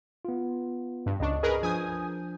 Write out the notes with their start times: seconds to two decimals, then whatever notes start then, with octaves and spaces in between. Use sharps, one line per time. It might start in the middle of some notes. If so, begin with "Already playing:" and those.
0.25 B3 F4
1.06 G2
1.20 C#2 D4 D#5 C#6
1.43 G#4 A#4 B4
1.63 F3 D4 G#5 D#6 G6